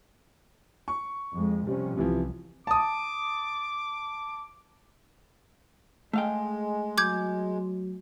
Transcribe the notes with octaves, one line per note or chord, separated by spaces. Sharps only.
C#6
F2 G#3
C3 F3 G3 C#4
C2 C3 E3 F3
A5 D6 D#6
G#3 A3 F5 G5
F#3 D6 G6 G#6